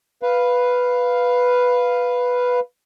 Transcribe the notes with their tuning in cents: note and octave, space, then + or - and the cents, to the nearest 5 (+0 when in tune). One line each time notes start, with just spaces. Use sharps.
B4 +0 F5 +0